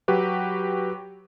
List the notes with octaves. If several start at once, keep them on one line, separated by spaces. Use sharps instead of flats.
F#3 F#4 G4 B4